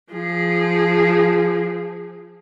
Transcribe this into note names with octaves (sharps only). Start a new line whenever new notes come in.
F3 G#4